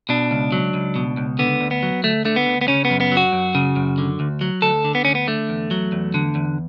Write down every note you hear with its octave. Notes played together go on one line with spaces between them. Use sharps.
B2 D4
C#2
F#3
C#2
B2
C#2
D3 B3
D2
B3
F#3
D2 A3
D3 A3
B3
D2
B3
C#3 C#4
B3
F#2
B3
F#3
F#4
F#2
C#3
F#2
D3
D2
F#3
D2 A4
D3
B3
D2 C#4
B3
D3 A3
E2
F#3
E2
D3
E2